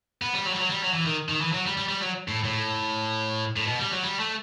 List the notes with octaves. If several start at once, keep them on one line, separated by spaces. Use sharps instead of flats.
B3
G3
F#3
G3
F#3
G3
F#3
E3
D#3
D#3
E3
F#3
G3
G3
G3
F#3
A2
A2
A2
B2
G3
F#3
G3
A3